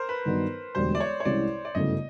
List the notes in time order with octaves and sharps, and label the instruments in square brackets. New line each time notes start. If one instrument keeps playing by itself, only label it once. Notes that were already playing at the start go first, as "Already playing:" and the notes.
Already playing: [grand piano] A#4 C5
B4
[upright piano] G2 D#3 F#3 B3 D#4
[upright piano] E1 D2 D3 G3 [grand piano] C5
[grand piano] D5
C#5
C#5
[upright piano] C2 C3 E3 G#3 C#4 [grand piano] D5
[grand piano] D5
[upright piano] G1 F#2 C#3 E3 A3 [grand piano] D#5